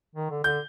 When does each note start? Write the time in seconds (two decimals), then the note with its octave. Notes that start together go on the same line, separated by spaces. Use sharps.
0.15 D#3
0.30 D3
0.44 D3 G6